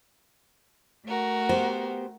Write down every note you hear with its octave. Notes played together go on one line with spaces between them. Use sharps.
A3 F#4 A#4
B3 G4 C5